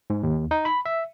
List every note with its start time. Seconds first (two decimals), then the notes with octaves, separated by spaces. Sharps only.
0.10 G#2
0.23 D#2
0.51 D#4
0.65 B5
0.86 E5